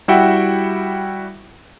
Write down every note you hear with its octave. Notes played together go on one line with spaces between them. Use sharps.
G3 E4 F#4 E5 F#5 G5